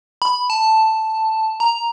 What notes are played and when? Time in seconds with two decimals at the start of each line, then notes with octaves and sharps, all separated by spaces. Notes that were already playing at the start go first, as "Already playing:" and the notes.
0.22 B5
0.50 A5
1.60 A#5